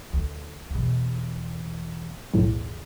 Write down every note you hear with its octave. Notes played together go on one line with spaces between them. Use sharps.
D2
E2 B2
B1 E2 A2 D3